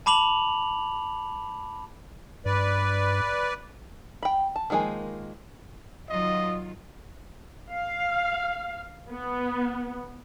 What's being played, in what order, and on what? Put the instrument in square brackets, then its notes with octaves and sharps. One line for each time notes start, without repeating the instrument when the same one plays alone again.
[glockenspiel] A5 B5 D6 F7 F#7
[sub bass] G2 [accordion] B4 D5
[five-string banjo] G5 B5
A5
D#3 F3 G#3 A#3 G#5
[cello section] D#3 F#3 F4 [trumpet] D#5
[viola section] F5
B3